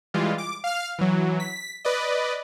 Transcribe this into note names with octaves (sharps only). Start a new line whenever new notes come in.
E3 G3 G#3 F4
D6
F5 F6
E3 F#3
B6
B4 D5 D#5